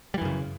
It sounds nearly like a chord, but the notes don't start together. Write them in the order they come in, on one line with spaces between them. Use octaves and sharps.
G3 E3 F#2 C#3